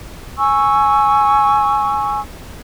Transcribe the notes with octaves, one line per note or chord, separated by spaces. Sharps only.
G#5 C#6 E6